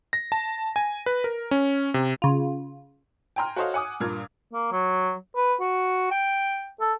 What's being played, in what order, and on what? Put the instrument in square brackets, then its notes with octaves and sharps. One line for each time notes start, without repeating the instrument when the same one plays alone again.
[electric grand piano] A#6
A5
G#5
B4
A#4
C#4
C3
[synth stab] C#3 F4
[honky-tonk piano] G5 G#5 A#5 C6 F6
F#4 A4 C5 C#5 D#5 F5
F#5 G#5 D6 D#6
G2 A#2 A#4 F6 G#6
[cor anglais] A#3
F#3
B4
F#4
G5
A4